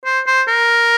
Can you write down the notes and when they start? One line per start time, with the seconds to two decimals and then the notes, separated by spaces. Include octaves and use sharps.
0.05 C5
0.27 C5
0.48 A#4